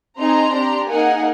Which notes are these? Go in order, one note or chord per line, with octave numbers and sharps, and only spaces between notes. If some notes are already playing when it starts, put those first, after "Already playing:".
C4 D#4 G#4 A#5 C6
D4 G4
A#3 D#4 G#4 F#5 G#5